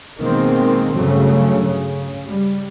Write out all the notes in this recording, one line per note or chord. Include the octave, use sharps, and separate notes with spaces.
B2 D#3 G#3 A#3 C4
G2 C#3 F#3 A3
C#3
G3